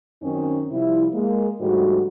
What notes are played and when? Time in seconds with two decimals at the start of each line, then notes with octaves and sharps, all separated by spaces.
0.22 F#2 D#3 C4 C#4 D#4
0.71 C3 F3 G3 E4
1.14 G#3 A#3
1.60 G#2 D3 F3 G3 A3 F#4